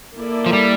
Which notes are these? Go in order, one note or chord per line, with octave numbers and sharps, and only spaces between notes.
A#3 E4 A4 D5
F3
G3